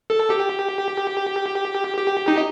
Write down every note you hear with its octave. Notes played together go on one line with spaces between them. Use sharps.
A4
G4
G4
D#4